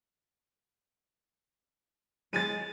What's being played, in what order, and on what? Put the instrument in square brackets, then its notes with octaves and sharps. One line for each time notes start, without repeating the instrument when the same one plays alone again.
[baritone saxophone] G#3 [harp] A6 D#7